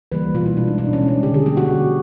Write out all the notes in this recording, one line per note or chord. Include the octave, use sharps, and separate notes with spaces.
E3 G3 A#3 B4
B2 F4
E4
G#3 D4
D#4
B2 D4
C#4
G#3
D4
D3 G4
G#4
F3 A#3 G4
F#4
D3